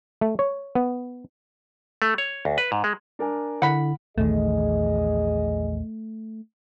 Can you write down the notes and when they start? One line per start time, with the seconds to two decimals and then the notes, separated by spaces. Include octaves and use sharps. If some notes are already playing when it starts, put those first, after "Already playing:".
0.21 A3
0.39 C#5
0.75 B3
2.02 A3
2.18 C#5
2.45 D2
2.58 B4
2.72 G#2
2.84 G#3
3.19 D4 A#4 G#5
3.62 D3 E4 F#5 B5
4.18 A#1 E2 D#3 A3 G#4 D#5